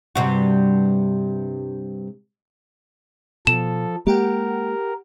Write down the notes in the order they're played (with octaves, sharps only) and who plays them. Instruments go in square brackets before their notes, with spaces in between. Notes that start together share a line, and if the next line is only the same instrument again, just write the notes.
[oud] G2 C3 F#4
[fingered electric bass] B2 [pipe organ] F3 A4 [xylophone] E7
[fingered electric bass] G#3 A#3 [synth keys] G4 F#5 G5 [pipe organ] A#4